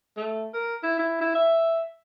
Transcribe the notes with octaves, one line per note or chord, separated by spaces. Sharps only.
A3
A#4
E4
E4
E4
E5